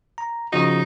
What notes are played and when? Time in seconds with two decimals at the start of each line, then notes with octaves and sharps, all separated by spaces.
0.18 A#5
0.53 C#3 F3 D#4 F#4